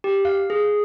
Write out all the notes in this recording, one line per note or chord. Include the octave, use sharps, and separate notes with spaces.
G4
F5
G#4